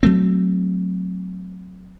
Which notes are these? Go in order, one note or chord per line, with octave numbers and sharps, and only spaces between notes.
F#3 A3 C4